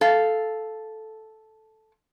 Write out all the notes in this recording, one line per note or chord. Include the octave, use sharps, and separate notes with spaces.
A4 F5